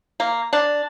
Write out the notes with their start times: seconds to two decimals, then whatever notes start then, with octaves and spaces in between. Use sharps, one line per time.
0.20 A#3
0.53 D4